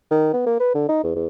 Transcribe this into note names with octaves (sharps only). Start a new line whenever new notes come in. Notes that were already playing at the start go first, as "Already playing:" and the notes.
D#3
B3
A#3
B4
D3
D#4
E2
E2